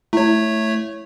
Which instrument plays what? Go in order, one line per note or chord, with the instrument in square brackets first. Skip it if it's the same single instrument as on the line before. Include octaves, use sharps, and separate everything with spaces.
[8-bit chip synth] A3 C#5 [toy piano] E4